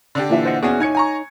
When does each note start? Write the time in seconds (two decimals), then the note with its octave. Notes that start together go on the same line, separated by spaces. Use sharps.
0.15 D3 D4 G4
0.30 A#2 E3 E5
0.45 C5 D#5 F#5
0.63 B3 C#4 F#4 G#4 D5
0.80 D#4 C#5 G#5 G#6 C#7
0.95 G#5 A#5 C#6